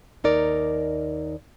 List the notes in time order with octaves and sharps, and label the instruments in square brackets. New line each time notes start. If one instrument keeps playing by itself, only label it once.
[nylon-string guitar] D#2 D#4 A#4 D5